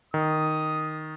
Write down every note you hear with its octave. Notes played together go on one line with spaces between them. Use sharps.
D#3 D#6